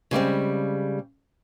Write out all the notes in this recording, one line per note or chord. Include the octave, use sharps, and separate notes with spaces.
C#3 G3 G#3 C4